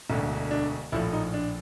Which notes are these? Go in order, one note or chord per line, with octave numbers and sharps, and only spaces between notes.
E1 D2 D3
D4
A#1 A2 F3 E4
D#4
D4